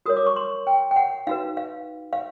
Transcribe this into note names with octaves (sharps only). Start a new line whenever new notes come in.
F#4 A#4 C#5 D#6
D6
C#6
C6
G5
G5
F#5
D#4 F#4 B4 F5
F5
F5